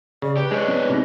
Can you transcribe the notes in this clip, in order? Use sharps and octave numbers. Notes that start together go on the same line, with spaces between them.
C#3 D5
G4 B4
G#3 D4 C#5
B3
C3 D#4 A#6